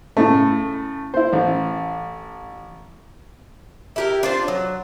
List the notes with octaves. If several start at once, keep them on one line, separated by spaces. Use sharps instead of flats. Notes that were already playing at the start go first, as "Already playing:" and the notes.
A2 C#3 A3
E4 C5
A1
E4 G4 A#4
D4 F4 C5
F#3